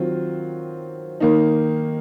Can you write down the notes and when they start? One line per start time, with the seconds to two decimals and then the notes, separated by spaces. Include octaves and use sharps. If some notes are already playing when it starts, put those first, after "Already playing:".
Already playing: D#3 F#3 C4 F4
1.20 D#3 A#3 D#4